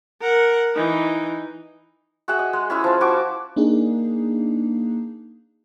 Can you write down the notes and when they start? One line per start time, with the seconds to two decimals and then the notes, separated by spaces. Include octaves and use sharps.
0.22 A#4 F#5
0.75 E3 D#4
2.28 F#4 G#4 E5 F#5
2.39 D#5
2.53 G#3
2.70 C#4 E4 G#4
2.84 F3 A5
3.01 E4 F#4 C#6 D6
3.56 A#3 D4 D#4 G#4